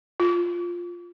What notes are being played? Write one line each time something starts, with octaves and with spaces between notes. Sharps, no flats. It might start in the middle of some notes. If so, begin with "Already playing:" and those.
F4